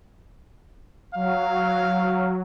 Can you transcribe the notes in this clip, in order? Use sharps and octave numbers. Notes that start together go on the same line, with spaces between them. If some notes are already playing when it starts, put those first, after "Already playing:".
F#3 F5